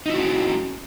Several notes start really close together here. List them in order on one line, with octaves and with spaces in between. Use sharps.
D#4 E4 F#4 C#4